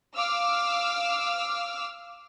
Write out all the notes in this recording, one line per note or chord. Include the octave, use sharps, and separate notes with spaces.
F5 D6 E6 F6